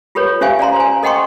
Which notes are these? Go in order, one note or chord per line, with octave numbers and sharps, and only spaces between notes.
F4 G4 A4 B4 C#5
C#4 G4 C5 E5 F5 G#5
D5 F5 A#5 C6
C5 G#5
A4 D#5 F#5 G5 C6 C#6